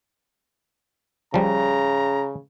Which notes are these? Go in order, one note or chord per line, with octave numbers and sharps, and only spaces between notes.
C#3 F3 G3 A#5